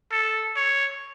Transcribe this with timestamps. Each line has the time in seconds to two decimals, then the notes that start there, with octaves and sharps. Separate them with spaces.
0.12 A4
0.57 C#5